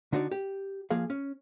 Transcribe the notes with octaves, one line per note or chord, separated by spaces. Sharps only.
D3 D4 D#4 F#4 B4 D5
G4
F3 A#3 G#4 F5
C#4